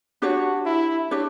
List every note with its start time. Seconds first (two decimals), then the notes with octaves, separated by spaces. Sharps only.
0.22 D4 F#4 G4 C#5
0.66 E4
1.11 D4 G4 C#5